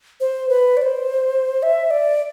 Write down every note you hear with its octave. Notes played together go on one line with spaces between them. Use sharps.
C5
B4
D5
C5
E5
D5